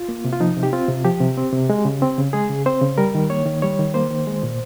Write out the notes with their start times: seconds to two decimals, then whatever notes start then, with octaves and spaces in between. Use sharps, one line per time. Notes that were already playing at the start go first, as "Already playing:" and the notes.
Already playing: F4
0.09 A#3
0.25 C3
0.33 F4
0.40 F3 D#4
0.56 C3
0.63 G4
0.73 C4 F4
0.88 C3
1.04 F3 G4
1.21 C3
1.37 C4
1.53 C3
1.70 G#3
1.85 C#3
2.02 C4
2.18 C#3
2.33 G#3 G#4
2.50 C#3
2.66 C4 C5
2.82 C#3
2.98 G3 A#4
3.15 D#3
3.30 A#3 C#5
3.46 D#3
3.62 G3 C#5
3.79 D#3
3.94 A#3 C5
4.11 D#3
4.27 G#3
4.43 A#2